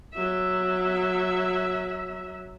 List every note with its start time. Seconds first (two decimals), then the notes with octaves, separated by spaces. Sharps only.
0.14 F#3 E5